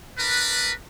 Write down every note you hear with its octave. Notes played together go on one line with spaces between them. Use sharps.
D4 A#4 B4